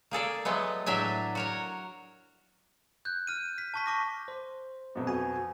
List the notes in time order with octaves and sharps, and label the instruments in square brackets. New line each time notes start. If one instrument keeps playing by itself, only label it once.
[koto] A#3 G#4 A4 D5
F#3 G#3 A3 B3
A2 F#3 D4 E5 G#5
F#4 A#4 C#5
[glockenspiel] F#6 G6
F6 D#7
B6
A5 C#6 B6
C#6 D6 A#6
[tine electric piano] C5
[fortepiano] B1 F2
[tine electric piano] F#4 G#5